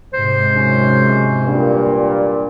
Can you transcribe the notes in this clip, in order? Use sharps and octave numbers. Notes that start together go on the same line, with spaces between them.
G#2 C3 C5
F#2 C#3 C#4
G2 A#2